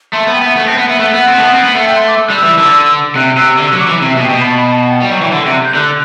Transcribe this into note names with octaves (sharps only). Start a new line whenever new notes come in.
A3 C6
A5
B3
G5
B3 E5
A3 F#5
C4 A5
B3 F#5
B3 E5
A3 F#5
B3
C4
A3
B3
C4
B3
A3 F#5
G5
C6
D6
E6
G3 F#6
E6
E3
D3
C3 F#6
C3 E6
D3 E6
F#6
F#3
D6
E3
C3 E5
B2
G5
B2
B5
A5
B5
A5
G5
G3 G5
F#3 G5
E3 G5
D3 F#5
G5
C3
F#6
G6
D3 F#6